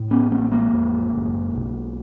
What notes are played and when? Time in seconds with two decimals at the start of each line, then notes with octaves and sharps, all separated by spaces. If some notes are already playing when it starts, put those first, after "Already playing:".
Already playing: A2
0.11 B3 C#4
0.31 A1 A#3 C4
0.52 G#3 A#3
0.73 F2
1.14 F#1
1.55 B1